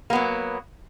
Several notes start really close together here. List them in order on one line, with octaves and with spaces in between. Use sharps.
A#3 B3 F#3